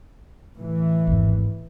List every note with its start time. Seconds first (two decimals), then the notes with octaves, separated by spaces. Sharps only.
0.56 A2 E3
1.07 G#1 E2